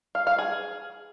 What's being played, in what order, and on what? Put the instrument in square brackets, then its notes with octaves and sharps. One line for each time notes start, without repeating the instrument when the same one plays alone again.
[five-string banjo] F5
F5
G#4